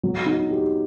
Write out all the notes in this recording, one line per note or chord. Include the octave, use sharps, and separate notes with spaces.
F#3
D#4
G4